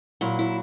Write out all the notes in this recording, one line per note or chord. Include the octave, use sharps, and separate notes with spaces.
A#2 F#3 E4
E4